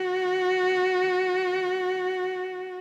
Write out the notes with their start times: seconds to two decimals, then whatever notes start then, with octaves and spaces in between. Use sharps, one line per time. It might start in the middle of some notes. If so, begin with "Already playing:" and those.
Already playing: F#4